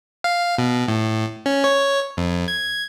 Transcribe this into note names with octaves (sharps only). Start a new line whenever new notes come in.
F5
B2
A2
C#4
C#5
F2
G#6